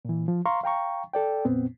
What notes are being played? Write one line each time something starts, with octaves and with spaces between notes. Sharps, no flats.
A#2 E3
F3
F5 A#5 C6 C#6
F5 G5 A#5 C#6
A4 D5 G5
F2 A#2 B3 C4